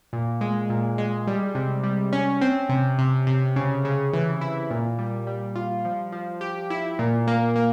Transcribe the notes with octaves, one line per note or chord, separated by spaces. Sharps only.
A#2
G#3
A#2
G#3
G3
C3
G3
C#4
C4
C3
C3
C3
C#3
C#3
E3
E4
A#2
G3
G3
F4
F3
F3
G4
E4
A#2
A#3
A#3